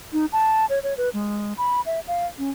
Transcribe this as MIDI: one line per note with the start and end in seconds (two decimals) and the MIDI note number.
0.13 0.26 63
0.32 0.66 81
0.70 0.79 73
0.83 0.96 73
0.97 1.09 71
1.14 1.53 56
1.58 1.81 83
1.86 2.00 76
2.08 2.26 77
2.38 2.50 61